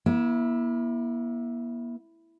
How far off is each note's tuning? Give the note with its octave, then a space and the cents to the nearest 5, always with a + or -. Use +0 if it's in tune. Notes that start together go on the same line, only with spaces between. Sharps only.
A#3 +45 E4 +0